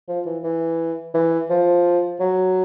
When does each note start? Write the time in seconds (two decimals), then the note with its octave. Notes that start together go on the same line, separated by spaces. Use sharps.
0.08 F3
0.26 E3
0.43 E3
1.14 E3
1.50 F3
2.20 F#3